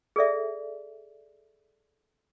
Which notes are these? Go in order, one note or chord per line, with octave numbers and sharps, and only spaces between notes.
G#4 A4 D5 E5